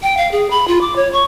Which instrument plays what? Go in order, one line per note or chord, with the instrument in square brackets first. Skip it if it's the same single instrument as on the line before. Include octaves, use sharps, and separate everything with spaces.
[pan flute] G5
F5
G#4
B5
F4
D6
C#5
C#6